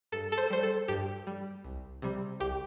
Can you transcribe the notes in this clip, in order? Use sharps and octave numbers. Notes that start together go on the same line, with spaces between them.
G2 A4
A4
C5
G3 C5
A4
G2 G4
G3
C2
C3 G3
C2 G4